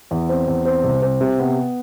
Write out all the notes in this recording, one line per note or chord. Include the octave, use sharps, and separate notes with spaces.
E2
C4
E2
C4
C2
C4
C3
B3